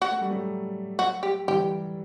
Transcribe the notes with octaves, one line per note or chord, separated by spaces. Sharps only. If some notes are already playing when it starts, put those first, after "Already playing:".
F#4
A3
G3
F#3 A3
F#4
G4
E3 G3 G4